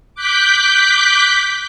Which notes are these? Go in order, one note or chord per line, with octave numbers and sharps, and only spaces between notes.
D6 F#6 G6 B6